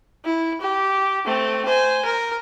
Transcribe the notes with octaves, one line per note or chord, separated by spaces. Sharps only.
E4
G4
A3 C4
C5 G#5
A#4